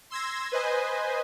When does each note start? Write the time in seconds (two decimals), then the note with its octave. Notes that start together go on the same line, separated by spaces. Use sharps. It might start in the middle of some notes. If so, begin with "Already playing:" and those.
0.10 C6 E6 G#6 A#6
0.52 B4 C5 D#5 G#5